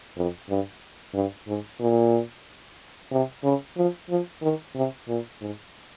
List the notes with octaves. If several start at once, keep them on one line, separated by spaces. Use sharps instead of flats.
F2
G2
G2
G#2
A#2
C3
C#3
F3
F3
D#3
C3
A#2
G#2